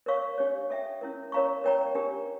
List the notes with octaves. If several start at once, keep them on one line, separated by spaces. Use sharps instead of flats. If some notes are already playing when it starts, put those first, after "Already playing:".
A#4 C#5 F5 C#6
D4 G4 C#5
A4 E5 G5
C#4 E4 A#4
A#4 C#5 F5 A#5 C#6
A#4 C#5 G5 A#5
D4 G4 A#4